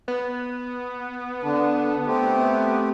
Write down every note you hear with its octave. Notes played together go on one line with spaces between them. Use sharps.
B3
D3 D4
A3 C4 G4